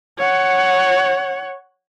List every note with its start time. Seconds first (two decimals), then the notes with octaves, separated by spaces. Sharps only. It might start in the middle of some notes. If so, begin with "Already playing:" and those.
0.18 C#5 F#5